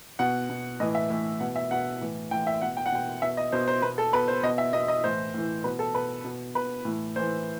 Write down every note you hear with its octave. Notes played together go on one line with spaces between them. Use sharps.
B2 F#5
B2
A2 E3 D#5
E5
A2 E3
B2 F#5
E5
B2 F#5
A2 E3
A2 E3 G5
E5
B2 F#5
G5
F#5
B2 G5
B2 E5
D#5
B2 C5
C5
B2 B4
A4
B2 B4
C5
B2 D#5
E5
B2 D#5
D#5
A2 E3 C5
A2 E3
B2 B4
A4
B2 B4
B2
B2 B4
A2 E3
A2 E3 C5